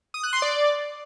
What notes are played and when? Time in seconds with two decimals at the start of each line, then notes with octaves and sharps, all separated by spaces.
0.14 D#6
0.23 F#6
0.33 C6
0.42 D5